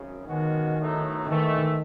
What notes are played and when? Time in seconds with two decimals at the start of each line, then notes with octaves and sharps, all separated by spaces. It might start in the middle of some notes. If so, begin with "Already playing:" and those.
Already playing: G#1 F#2 C#3
0.26 C#2 B2 D#3 G#3 C#4 F#4
0.76 B1 A2 F#3 A3 D#4
1.25 G#2 D#3 E3 A3